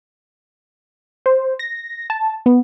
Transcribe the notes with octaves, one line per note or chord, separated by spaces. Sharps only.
C5
A#6
A5
B3